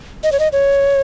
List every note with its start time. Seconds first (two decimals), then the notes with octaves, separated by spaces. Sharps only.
0.24 D#5
0.32 C#5
0.40 D#5
0.52 C#5